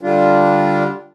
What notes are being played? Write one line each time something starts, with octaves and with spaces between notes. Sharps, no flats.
D3 G3 D4 F4